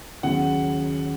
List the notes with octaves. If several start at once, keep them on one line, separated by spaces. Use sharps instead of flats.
D#2 C#3 F#3 F#5